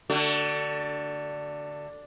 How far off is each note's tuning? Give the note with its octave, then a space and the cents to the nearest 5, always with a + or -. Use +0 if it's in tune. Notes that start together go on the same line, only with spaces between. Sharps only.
D3 +0 A3 +25 F#4 +35